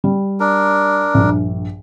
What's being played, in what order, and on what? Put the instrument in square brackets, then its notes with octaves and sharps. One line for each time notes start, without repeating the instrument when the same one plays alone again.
[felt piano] G3
[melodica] D4 A#4
[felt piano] A#1 G2